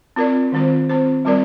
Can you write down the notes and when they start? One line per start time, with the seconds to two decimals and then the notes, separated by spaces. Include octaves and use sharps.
0.16 C4 F4 A#4 D5
0.52 D#3 G#3 C4 F4 C5
0.89 C4 F4 C5
1.25 G3 C4 F4 A#4 D5